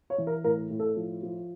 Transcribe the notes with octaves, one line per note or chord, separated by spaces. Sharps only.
C#5
E3
A#4
A2 A#4
A2
A4
F3
F3